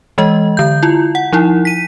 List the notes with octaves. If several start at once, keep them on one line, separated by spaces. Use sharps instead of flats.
E3 G#3 D#5
D3 G6
E4 F4
F#5
F3 D#4 E4
B6 D#7